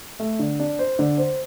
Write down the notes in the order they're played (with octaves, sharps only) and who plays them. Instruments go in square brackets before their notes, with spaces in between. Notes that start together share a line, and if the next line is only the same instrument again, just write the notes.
[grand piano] A3
D3
D4
C5
D3
C5